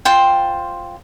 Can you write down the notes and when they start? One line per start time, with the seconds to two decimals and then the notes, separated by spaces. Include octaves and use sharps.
0.05 F4 C5 G5